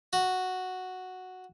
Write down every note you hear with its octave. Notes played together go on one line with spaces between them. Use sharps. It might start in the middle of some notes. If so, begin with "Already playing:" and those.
F#4